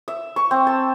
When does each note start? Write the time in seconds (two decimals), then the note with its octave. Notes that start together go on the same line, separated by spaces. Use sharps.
0.08 E5
0.36 C#6
0.51 C4
0.67 A5